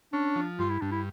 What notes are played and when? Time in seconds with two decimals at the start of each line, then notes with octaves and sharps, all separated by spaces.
0.13 C#4 D4
0.36 F3
0.59 G2 F4
0.70 E4
0.81 G2 D4
0.91 E4